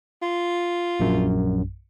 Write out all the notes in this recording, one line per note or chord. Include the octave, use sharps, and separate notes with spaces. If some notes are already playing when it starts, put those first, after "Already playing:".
F4
A#1 F#2